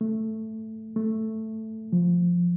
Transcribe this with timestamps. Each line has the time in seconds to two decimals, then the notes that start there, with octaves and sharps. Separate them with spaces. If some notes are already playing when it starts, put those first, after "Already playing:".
0.01 A3
0.96 A3
1.93 F3